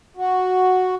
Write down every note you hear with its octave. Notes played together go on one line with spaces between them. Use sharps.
F#4